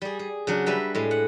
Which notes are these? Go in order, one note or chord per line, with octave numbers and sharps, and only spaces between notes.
G3 G#4
G#4
C#3 F#3 D4
G3 B4 E5 A#5
A2 G#3
F#5